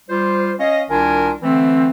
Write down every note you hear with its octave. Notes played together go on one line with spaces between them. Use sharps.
G3 F4 C5
C#4 D#5 F5
C2 D#3 D4 F4 A#4 G#5
D3 E3 A3 C4